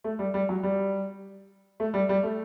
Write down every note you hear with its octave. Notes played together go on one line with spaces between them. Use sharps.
A3
G3
G3
F#3
G3
A3
G3
G3
A3